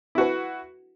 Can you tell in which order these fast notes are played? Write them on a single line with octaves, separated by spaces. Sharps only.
E4 F#4 B4